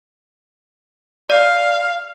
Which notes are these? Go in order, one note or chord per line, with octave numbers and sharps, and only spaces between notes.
D5 F5